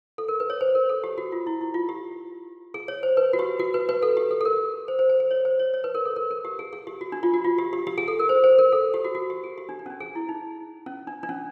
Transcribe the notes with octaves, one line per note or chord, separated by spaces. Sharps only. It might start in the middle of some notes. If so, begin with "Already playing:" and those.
A4
A#4
B4
C#5
C5
A#4
A4
G4
F#4
F4
E4
E4
F4
G4
G#4
C#5
C5
B4
F#4
G4
F#4
B4
B4
A4
G4
A4
A4
A#4
C5
C5
C5
C5
C#5
C5
C#5
C#5
B4
A#4
A4
A#4
A#4
G4
G#4
G#4
G4
F#4
D4
F4
F#4
F4
G4
G4
G4
G#4
A4
A#4
C5
C5
A#4
A4
G4
F#4
F#4
G4
G#4
G4
D4
D4
C#4
D4
G#4
E4
D#4
C#4
D4
D4
C#4